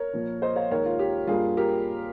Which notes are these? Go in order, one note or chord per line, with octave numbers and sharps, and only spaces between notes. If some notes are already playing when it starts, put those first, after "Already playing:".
Already playing: A#4 C#5
A#2 F3 A#3
C5 D#5
C#5 F5
D#2 D#3 G#3 A#4 C#5
F4
G4
G2 G3 A#3 F4 G#4
G4 A#4